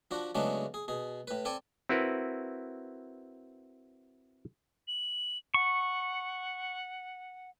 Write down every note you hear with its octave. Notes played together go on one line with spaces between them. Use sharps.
F3 D4 F#4
C#3 F#3 G#3 A3 B3 D4
G#4
B2 G#4
A2 B4
C4 A4 D5 G#5
C4 E4 F#4 A#4 B4
F#7
F#5 C#6